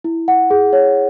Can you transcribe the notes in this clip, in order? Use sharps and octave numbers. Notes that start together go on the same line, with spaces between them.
E4
F#5
G#4
C#5